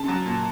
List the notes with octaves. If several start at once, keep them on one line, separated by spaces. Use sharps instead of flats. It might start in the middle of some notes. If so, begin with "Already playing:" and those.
Already playing: C#3 A5
F#3
A#2